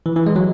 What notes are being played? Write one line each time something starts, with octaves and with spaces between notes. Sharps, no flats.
E3
E3
G#3
F#3